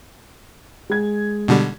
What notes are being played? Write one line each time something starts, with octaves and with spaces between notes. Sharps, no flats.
G#3 G#6
B2 D3 G3